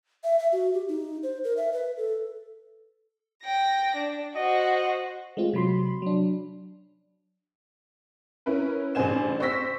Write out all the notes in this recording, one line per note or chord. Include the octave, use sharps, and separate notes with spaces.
E5
E5
F#4
G4
D#4
C5
A#4
E5
B4
A4
G5 A#6
D4
F#4 C5 D#5
G#3 A3 C4 F4
C3 F#3 B5 C6
F#3 D4
C#4 E4 A#4 B4
A1 G2 C#3 C5 G#5 E7
C5 C#6 E6 A#6 B6